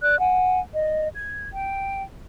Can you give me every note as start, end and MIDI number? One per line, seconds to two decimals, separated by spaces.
0.02 0.18 74
0.02 0.18 90
0.19 0.58 78
0.19 0.58 80
0.74 1.07 74
0.74 1.07 75
1.14 1.47 92
1.51 2.01 79